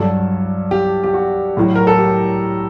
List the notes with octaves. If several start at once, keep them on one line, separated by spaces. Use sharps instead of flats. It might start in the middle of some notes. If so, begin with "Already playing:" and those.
Already playing: G2 F#3 A4
G4
G4
F#4
A2 F#3
A#4
A4
G4